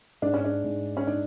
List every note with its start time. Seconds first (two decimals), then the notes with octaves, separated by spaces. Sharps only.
0.22 G#2 D4
0.34 C#4
0.45 D4
0.64 G#2
0.97 C#4
1.07 D4 D#4